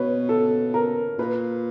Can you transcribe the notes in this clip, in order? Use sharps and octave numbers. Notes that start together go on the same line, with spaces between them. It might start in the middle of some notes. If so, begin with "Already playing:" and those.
Already playing: B2 B4 C#5
A4
A#4
A#2 B4